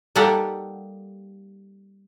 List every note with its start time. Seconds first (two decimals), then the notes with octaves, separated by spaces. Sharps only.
0.16 G3 A#3 D#4 G4 A4 F#5